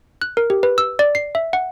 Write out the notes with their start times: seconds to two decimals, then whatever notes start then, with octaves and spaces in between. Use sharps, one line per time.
0.22 F#6
0.37 A#4
0.50 G4
0.63 B4
0.78 E6
0.99 D5
1.15 C7
1.35 E5
1.53 F#5